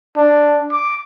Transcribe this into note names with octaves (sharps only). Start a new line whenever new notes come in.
D4
D6